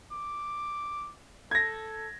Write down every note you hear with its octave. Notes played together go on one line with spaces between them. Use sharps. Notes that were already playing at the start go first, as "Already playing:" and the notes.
D6
A4 G#6 A#6